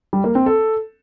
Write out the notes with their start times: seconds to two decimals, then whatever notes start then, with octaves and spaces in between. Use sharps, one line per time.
0.13 G3
0.24 A#3
0.35 C4
0.46 A4